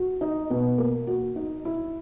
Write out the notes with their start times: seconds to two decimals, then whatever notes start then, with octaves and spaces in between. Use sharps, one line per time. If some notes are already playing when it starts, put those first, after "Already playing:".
Already playing: F#4
0.21 D#4
0.50 B2
0.78 A#3
1.07 F#4
1.36 D#4
1.65 E4